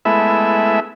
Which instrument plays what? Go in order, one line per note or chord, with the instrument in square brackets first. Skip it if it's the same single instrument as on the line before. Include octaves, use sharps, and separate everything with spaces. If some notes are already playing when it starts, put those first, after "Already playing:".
[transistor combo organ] G#3 A3 B3 E4 E5